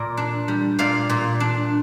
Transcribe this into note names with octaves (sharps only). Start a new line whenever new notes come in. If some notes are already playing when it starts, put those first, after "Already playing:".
Already playing: A#2 A#4 D5
D4
G3
A#2 D5 F5
A#2
D4